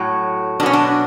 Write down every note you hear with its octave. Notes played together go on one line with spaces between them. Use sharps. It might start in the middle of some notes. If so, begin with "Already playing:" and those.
Already playing: A2 F#3
B2 F#3 C#4 D4
D4